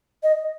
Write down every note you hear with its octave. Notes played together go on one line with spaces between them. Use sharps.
D#5